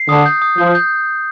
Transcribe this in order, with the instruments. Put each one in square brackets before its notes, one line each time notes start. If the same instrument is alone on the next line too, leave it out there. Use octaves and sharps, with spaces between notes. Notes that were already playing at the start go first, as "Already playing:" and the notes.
Already playing: [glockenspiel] C7
[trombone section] D3 [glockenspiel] D#6
[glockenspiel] G6
D#6
[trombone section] F3 [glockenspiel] G6
[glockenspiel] G6